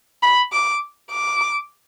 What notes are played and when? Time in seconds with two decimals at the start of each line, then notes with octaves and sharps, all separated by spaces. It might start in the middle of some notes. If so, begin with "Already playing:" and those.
0.23 B5
0.52 D6
1.11 D6